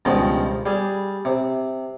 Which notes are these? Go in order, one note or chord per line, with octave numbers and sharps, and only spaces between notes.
C#2 G2 B2 D#3 F3 G#3
G3 G#4
C3